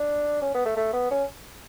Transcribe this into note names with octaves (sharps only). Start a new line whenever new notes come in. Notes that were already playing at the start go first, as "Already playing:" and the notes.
Already playing: D4
C#4
B3
A3
A3
B3
C#4